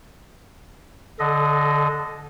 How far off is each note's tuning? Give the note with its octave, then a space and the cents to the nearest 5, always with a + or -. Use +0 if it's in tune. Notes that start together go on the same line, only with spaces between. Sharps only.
D3 +0 A4 -30 D#5 +0